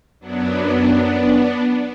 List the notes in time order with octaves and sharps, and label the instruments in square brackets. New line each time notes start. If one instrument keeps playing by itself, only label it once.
[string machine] F#2 F#3 B3 D4